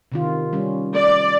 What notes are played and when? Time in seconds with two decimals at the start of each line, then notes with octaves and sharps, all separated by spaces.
0.12 C3 D#3 F4
0.53 G3 C#4
0.95 D5